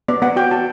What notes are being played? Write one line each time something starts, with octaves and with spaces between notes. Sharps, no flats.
B3 D5
B3 F#5
F#4 G5
F#4 A5